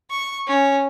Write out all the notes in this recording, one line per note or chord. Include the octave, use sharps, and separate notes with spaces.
C#6
C#4